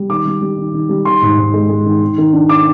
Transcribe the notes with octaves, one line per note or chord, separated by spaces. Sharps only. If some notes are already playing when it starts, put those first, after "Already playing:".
Already playing: G3
D#3 D6
G3
G3
D#3
D#3
G3
D#3 C6
G#2
G#2
G#3
G#3
D#3
D#3
D#3
D4
D6